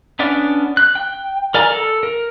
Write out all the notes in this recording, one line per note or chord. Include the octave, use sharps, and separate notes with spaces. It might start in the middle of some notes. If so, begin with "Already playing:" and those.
B3 C#4 D4 D5
F#6
G5
A#4 D5 G#5 A#5
A4
A#4